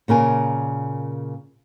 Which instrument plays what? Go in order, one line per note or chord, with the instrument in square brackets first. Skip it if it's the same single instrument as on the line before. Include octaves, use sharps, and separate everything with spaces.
[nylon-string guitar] A#2 C#3 A#4 G#5